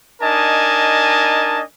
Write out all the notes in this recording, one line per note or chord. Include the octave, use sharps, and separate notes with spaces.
D4 D#4 A#4 D#5 G#5 A5